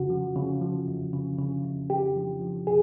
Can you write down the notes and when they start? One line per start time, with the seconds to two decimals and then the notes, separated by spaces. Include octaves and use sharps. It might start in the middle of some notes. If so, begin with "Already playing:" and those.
Already playing: F2 C#3 F#4
0.10 F3
0.36 C#3
0.61 F3
0.87 F2
1.13 C#3
1.39 C#3
1.64 F2
1.90 F2 G4
2.16 F3
2.42 F3
2.67 B2 G#4